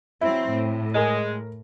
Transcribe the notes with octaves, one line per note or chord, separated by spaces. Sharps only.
F#3 C4 E4
A2
G#3 A#4